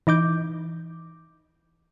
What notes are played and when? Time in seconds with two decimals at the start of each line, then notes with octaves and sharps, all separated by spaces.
0.07 E3 D#4 D6 G6